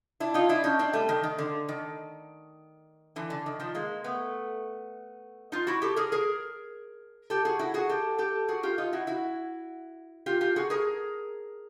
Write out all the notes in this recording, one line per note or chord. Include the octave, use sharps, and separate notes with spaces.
D4 E4
D#4 F4
D4 E4
C#4 D#4
C4 D4
G3 A3
D#3
D#3
D3
D#3
D3 E3
D3
D#3
D#3 F3
G#3 A#3
A3 B3
D#4 F4
E4 F#4
G4 A4
G#4 A#4
G#4 A#4
G4 A4
F#4 G#4
E4 F#4
F#4 G#4
G4 A4
G4 A4
F#4 G#4
F4 G4
D#4 F4
E4 F#4
E4 F#4
F4 G4
F4 G4
F#4 G#4
G#4 A#4